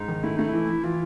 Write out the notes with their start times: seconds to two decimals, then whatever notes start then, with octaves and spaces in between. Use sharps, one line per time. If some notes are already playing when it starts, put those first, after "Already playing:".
Already playing: G#2 D#4
0.08 D#3
0.23 A3 E4
0.36 A3 D#4
0.49 E3 E4
0.69 E3
0.84 E3 F4